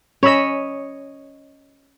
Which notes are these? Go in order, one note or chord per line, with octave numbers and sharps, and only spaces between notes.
C#4 C#5 D#5 B5 E6